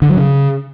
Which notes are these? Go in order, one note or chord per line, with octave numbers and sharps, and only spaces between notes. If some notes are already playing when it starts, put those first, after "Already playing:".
D3
F#3
C#3